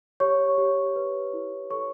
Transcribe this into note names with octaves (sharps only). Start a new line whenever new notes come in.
G4 C#5 C#6
G4
B4
E4
A4 C#5 C#6